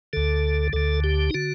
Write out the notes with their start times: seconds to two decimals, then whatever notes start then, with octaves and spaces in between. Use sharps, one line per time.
0.13 D2 D3 A4
0.73 D2 D3 A4
1.04 G4
1.30 D#4
1.34 D3 F#4